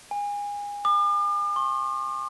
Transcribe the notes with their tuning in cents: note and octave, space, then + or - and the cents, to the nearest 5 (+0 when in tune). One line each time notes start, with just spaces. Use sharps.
G#5 -25
D6 +45
C6 +45